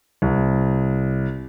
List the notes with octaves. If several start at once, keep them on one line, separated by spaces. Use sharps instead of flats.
C2